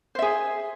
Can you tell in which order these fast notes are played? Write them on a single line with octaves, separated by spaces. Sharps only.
C5 E5 G#4